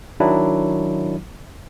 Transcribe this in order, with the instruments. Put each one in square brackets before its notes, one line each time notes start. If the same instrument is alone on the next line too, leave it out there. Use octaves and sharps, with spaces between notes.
[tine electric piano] D#3 F#3 D4 E4